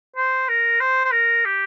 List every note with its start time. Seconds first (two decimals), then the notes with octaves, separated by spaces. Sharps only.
0.16 C5
0.49 A#4
0.80 C5
1.05 C5
1.12 A#4
1.45 G4